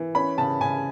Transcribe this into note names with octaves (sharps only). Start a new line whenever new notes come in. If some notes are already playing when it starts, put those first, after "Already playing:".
Already playing: E3
C#4 B5
C#3 A5
C#3 G#5